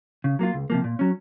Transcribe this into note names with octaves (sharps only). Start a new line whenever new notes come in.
C#3
F#3 A#3 F4
C#2
C3 F3 A#3
A#2
F#3 C#4